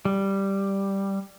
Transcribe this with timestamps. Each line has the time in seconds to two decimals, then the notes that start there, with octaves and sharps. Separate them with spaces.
0.05 G3